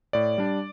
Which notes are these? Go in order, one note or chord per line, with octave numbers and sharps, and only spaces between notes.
A2 D5
G3 D4